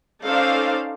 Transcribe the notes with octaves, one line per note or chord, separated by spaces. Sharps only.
C#4 D#4 A4 C5 D5 F5